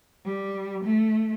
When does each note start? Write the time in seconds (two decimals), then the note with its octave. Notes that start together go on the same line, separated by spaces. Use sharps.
0.24 G3
0.83 A3